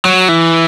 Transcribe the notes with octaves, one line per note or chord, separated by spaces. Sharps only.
F#3
E3